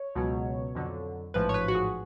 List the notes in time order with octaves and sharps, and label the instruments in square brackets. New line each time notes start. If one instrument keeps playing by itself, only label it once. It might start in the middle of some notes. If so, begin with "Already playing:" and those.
Already playing: [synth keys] C#5
C#2 B2 F#3
F2 D3 F#3
A1 G#2 F3 B4
C#5
B4
F#4
G#4